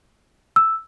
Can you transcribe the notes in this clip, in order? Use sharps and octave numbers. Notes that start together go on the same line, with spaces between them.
E6